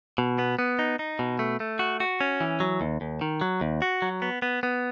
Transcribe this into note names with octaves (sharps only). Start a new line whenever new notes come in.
B2
B3
B3
D#4
D#4
B2
A3
A3
F#4
F#4
C#4
E3
F#3
D#2
D#2
D#3
F#3
D#2
F#4
F#3
B3
B3
B3